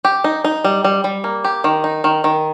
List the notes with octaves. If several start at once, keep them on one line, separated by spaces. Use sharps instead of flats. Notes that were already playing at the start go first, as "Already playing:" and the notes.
G4
D#4
D#4
G3
G3
G3
A#3
G4
D#3
D#4
D#3
D#3